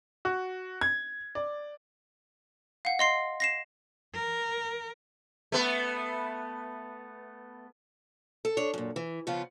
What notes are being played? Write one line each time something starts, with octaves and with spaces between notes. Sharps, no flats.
F#4
G#6
D5
F5 F#5
D#5 C6 C7
A#6 C7 E7
A#4
A3 B3
A4
D4 C#5
F#2 A#2
E3
C#3 F3 B3 F4